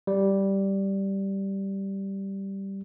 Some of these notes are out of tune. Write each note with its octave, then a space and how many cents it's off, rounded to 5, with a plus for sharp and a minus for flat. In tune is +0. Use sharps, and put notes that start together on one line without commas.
G3 -5